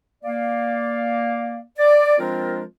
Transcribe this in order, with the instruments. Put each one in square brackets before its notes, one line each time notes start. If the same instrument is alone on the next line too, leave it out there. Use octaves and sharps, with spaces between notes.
[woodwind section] A#3 D5 F5
D5
F3 G#3 C4 D4 F4 A#4